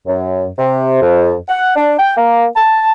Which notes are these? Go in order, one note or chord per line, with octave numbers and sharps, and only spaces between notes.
F#2
C3
F2
F#5
D4
G5
A#3
A5